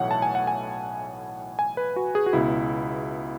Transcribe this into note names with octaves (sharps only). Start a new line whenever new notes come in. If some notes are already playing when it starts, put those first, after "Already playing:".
Already playing: B1 A2 E3 C#5 F#5
A5
G#5
F#5
G#5
G#5
B4
F#4
G#4
F#4
C#2 B2 E4